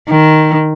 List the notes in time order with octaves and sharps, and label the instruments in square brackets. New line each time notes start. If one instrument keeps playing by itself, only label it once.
[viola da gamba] D#3